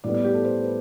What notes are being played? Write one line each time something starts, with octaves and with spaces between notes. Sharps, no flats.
A2 G3 B3 D5
D5
G4
A4
C5
B4